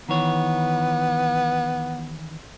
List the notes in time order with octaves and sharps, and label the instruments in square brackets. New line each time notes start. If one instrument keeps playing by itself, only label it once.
[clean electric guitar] D#3 E3 C#5 [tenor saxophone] B3